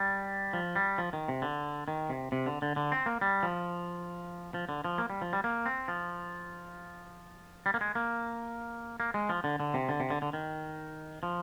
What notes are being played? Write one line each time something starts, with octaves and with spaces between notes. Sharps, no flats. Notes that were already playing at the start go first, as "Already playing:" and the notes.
Already playing: G3
F3
G3
F3
D#3
C3
D3
D#3
C3
C3
D3
D3
D3
C4
A#3
G3
F3
F3
D3
F3
A#3
G3
F3
G3
A#3
C4
F3
G3
A#3
G#3
A#3
A#3
G#3
F3
D3
D3
C3
D3
C3
D3
D3
D#3
F3